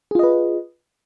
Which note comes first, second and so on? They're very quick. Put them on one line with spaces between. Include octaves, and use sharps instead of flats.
G#4 F4 D#5 B4